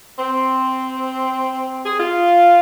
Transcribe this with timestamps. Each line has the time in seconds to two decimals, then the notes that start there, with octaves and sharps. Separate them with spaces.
0.19 C4
1.84 G#4
1.97 F4